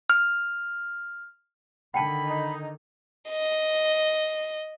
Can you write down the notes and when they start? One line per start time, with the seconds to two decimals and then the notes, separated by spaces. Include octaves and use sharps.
0.10 F6
1.94 D3 D#3 F#5 G5 A5 B5
2.24 D#4
3.30 D#5